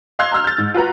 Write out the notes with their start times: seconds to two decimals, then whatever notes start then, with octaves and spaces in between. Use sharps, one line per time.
0.19 D#5 F5 C6 E6 F#6 G#6
0.32 A#5 C6 E6 F6
0.44 G6 A6
0.58 G#2
0.74 F4 F#4 B4 A#5